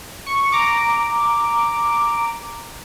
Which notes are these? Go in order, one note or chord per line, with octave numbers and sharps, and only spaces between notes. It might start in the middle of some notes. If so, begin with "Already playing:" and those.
C#6
A#5 D6